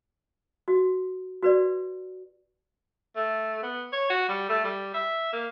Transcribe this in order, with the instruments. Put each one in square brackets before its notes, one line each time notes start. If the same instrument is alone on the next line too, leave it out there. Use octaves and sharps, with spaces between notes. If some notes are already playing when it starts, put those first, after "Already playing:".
[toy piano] F#4
F#4 B4 D5
[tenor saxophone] A3
B3
C#5
F#4
G3
A3
G3
E5
A#3